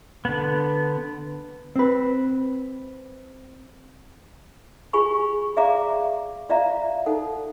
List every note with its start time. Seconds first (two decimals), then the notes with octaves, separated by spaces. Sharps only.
0.25 D3 B3
1.76 C4 B4
4.93 F4 G4 G#4 G#5 B5 C#6
5.56 G#4 D5 E5 F5 A#5 D6
6.49 F4 D5 E5 F5 A#5
7.06 D#4 A4 F#5